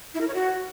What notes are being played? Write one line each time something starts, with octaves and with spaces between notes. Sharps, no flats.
E4
A#4
C#5
F#4